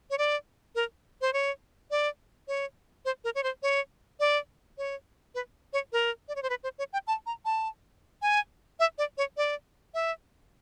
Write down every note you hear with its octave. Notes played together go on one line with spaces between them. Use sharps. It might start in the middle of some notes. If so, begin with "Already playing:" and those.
C#5
D5
A#4
C5
C#5
D5
C#5
C5
A#4
C#5
C5
C#5
D5
C#5
B4
C#5
A#4
D5
C#5
C5
B4
C5
C#5
G5
A5
A#5
A5
G#5
E5
D5
C#5
D5
E5